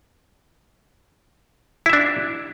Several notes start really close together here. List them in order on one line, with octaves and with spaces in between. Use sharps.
E4 E5 D4